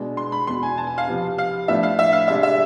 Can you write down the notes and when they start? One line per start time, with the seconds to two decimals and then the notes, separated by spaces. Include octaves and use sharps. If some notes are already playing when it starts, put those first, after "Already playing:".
Already playing: B2 G#3 D4
0.17 C6
0.32 B5
0.47 E2 B2 B3 C6
0.63 G#5
0.77 A5
0.87 G#5
0.98 F5
1.07 C3 F3 B3
1.38 F5
1.68 A2 F3 B3 D4 E5
1.83 F5
1.99 E5
2.13 F5
2.28 C3 G#3 D4 E5
2.43 E5